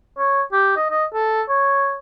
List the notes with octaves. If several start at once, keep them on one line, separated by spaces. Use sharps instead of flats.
C#5
G4
D#5
D#5
A4
C#5